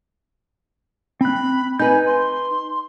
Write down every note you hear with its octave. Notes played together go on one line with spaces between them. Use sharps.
C4 B5 F#6
D#4 B4 G#5 G6
C6